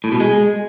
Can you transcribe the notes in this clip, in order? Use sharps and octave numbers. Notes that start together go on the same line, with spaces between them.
A2
B2
G#3